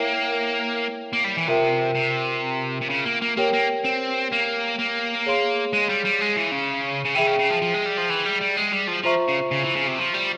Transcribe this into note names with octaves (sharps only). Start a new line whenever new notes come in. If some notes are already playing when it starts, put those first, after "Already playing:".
Already playing: A#3 E4 A#4 C#5 E5 G5
A#3
G3
E3
C3 F4 A#4 E5 G5
C3
C3
C#3
A#3
A#3
A#3 G4 A#4 C#5 G5
A#3
C4
A#3
A#3
G#4 C#5 F5 C6
G#3
G3
G3
G#3
E3
C#3
C#3
E3 G#4 E5 G5
C#3
C#3
F3
F3
G#3
G3
F3
E3
G3
G3
G#3
G3
F3
F3 F4 C5 E5 A#5 C#6
C#3
C#3
E3
C#3
C3
F3
G3